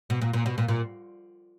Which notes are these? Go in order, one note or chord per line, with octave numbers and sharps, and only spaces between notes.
B2
A#2
A#2
B2
A#2
A#2